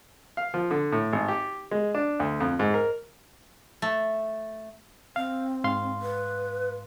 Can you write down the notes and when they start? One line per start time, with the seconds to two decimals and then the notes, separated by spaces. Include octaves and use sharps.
0.37 F5
0.54 F3
0.71 D3
0.92 A2
1.13 G#1
1.28 G4
1.71 G#3
1.95 D4
2.20 D2
2.40 F2
2.59 G#2
2.74 A#4
3.82 A3
5.16 C4 F5
5.64 G#2 F5 C6
6.02 B4